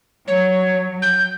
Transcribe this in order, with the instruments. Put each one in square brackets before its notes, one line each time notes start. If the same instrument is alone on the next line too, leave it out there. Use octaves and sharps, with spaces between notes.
[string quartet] F#3 [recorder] C#5
[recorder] G6